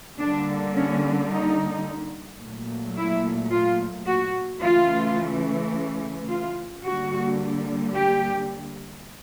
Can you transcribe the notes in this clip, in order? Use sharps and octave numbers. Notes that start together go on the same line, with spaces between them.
D3 G3 A#3 D4
C#4
D#4
A#2 F#3 A3
E4
F4
F#4
C#3 E3 A3 F4
F4
D3 G3 A#3 F#4
G4